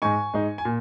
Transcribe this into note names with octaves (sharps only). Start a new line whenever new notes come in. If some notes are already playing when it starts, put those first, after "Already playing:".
G#2 G#3 D#4 G#5 C#6
G#2 G#3 D#4
G#5
A#2